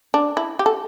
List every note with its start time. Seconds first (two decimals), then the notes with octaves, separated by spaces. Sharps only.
0.14 D4
0.37 E4
0.59 G4
0.66 A4